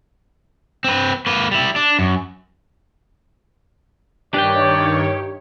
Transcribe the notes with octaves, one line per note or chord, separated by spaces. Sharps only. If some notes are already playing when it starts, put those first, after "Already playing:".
C4 B4
A#3 B4
G3 E4
D4
F#2
G2 D#3 D4 G4 B4 C#5 D5 G5